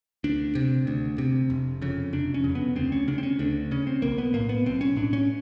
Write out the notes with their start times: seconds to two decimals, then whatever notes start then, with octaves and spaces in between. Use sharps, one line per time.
0.24 D2 D4
0.55 C3
0.87 D2
1.18 C3
1.50 F1
1.82 F2 C#3
2.13 F1 D4
2.34 C#4
2.44 F2 C#3
2.55 B3
2.76 D2 C4
2.92 C#4
3.08 C#3 D4
3.18 C4
3.23 C#4
3.39 D2 D4
3.71 C#3 C#4
3.87 C4
4.02 B1 A#3
4.18 B3
4.34 A2 A#3
4.49 B3
4.66 B1 C4
4.81 C#4
4.97 A2 D4
5.13 C#4